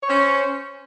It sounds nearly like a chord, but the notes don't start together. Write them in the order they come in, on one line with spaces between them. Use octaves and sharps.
C#5 C5 C#4